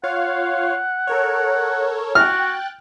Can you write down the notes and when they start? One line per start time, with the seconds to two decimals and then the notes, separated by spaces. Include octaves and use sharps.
0.04 F4 C#5 F5 F#5
1.07 A4 A#4 C#5
2.15 F#4 G5 F6 F#6 A6